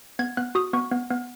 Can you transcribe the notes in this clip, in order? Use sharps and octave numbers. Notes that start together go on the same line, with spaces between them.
B3 G#6
B3 F#6
F#4 D#6
B3 C#6
B3
B3